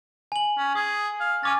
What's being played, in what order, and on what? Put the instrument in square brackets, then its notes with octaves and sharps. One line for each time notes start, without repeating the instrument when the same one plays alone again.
[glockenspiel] G#5 F#7
[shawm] C#4
[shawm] G#4 [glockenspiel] D#6
[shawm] F5
[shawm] C#4 [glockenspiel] G#5 D6 A6